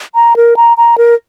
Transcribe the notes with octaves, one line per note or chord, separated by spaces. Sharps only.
A#5
A#4
A#5
A#5
A#4